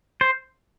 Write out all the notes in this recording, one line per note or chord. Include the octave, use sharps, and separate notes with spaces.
C5